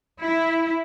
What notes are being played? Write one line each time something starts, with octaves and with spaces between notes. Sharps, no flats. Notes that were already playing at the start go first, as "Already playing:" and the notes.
E4